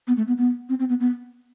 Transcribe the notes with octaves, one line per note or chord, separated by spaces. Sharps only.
B3
A3
B3
B3
C4
C4
B3
B3